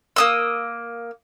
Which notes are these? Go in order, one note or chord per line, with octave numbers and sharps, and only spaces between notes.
A#3 D#6 E6